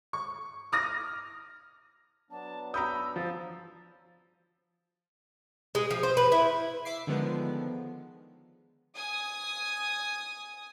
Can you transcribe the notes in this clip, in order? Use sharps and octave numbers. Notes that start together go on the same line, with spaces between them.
C#6
D6 D#6 F6 A#6
F#3 B3 D4 A5
A#5 B5 D#6 E6 G6
F3 A6
G#3
F3
C5
B4
E4
E5 D6 C7
D3 D#3 F3 G#3 B3
G#5 D#6